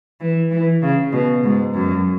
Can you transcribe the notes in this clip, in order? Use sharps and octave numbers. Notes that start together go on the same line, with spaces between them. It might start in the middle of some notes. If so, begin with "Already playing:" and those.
E3
E3
C#3
B2
G#2
F#2